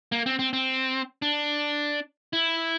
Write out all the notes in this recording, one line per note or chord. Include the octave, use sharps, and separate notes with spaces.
A#3
C4
C4
C4
D4
E4